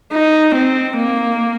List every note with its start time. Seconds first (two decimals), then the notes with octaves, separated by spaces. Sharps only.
0.12 D#4
0.55 C4
0.97 A#3